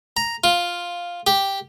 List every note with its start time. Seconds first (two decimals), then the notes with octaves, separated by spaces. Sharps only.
0.17 A#5
0.44 F4
1.27 G4